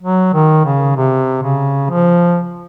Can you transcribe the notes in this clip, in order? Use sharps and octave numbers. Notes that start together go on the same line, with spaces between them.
F#3
D#3
C#3
C3
C#3
F3